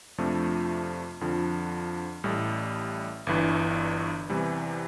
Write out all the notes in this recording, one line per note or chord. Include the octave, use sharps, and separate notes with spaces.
F2 C3 F3 A3 D4
F2 D3 F3
A1 A2 G3
G1 G2 E3
E2 C3 E3 G3